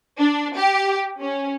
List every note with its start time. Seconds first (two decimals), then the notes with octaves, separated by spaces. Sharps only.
0.19 D4
0.57 G4
1.20 C#4